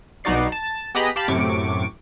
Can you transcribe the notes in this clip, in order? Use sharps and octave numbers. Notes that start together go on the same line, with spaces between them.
B1 B3 D#4 F#4 D5 C7
A5
B3 G4 G#4 D#5 A#5 B5
G4 F5 A5 B5
F#2 A2 C3 C#6 D6 D7